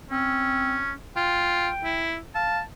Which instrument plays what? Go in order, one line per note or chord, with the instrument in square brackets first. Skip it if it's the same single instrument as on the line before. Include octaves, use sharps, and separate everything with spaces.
[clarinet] C4 [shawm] C#4
[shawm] F4 [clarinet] G5
[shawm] E4
[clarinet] F5 [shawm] A5